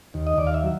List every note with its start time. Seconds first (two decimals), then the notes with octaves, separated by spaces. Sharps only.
0.14 D#2
0.27 D#5
0.38 D#2 D5
0.47 F5
0.54 E5
0.64 F#3